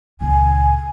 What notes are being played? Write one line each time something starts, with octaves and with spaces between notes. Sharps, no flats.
C#2 A#2 G#5